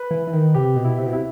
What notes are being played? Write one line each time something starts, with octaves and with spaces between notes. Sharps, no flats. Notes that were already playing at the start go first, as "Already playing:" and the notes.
Already playing: B4
E3
E3
D#3
C3 G4
B2
E4
C3
B2
C3 E4